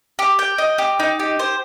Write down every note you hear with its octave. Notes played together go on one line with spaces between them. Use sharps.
G4
G5
D#5
G4
D#4
G4
C5